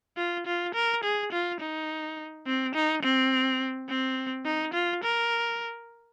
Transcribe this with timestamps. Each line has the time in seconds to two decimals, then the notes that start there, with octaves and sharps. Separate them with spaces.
0.17 F4
0.46 F4
0.74 A#4
1.04 G#4
1.32 F4
1.60 D#4
2.47 C4
2.75 D#4
3.03 C4
3.89 C4
4.45 D#4
4.74 F4
5.03 A#4